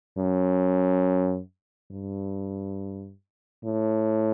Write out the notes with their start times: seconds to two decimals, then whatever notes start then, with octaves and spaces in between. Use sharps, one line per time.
0.18 F#2
1.92 G2
3.65 A2